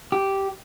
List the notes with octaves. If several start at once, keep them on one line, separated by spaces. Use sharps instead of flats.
G4